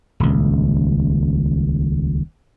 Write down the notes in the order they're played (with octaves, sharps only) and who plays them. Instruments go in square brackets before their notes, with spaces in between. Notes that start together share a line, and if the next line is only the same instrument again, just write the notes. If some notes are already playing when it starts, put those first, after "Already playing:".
[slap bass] D#1 C#2